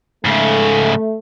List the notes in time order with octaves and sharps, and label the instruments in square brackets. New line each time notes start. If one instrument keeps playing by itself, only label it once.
[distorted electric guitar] G#2 C#3 [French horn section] A3